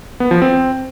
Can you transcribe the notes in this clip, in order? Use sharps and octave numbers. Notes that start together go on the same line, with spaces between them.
B3
F3
C4